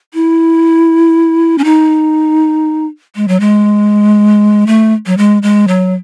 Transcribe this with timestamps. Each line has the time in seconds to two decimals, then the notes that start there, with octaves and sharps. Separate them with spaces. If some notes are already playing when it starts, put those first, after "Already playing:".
0.14 E4
1.58 C#4
1.64 D#4
3.16 G#3
3.28 F#3
3.40 G#3
4.67 A3
5.06 F#3
5.17 G#3
5.43 G#3
5.68 F#3